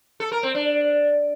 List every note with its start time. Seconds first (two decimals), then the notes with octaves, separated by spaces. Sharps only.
0.20 A4
0.32 A#4
0.43 C4
0.55 D4